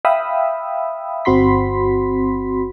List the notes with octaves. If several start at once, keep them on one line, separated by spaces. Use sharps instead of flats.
E5 F5 G5 B5 D#6 E6
G1 C4 F#4 B5 C6 B6